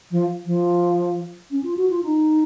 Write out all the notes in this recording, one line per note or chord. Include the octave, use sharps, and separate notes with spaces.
F3
F3
C#4
F4
F#4
F4
D#4